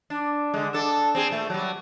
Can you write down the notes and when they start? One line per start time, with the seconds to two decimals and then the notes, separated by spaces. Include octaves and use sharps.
0.10 D4
0.54 D3 G#3
0.73 D4 A4
1.15 C4 G#4
1.30 A#2 A3
1.50 F#3 G3